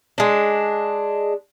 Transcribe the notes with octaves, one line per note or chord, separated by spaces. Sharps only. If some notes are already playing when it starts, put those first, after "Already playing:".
G#3 D4